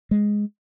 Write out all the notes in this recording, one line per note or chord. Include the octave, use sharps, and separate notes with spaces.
G#3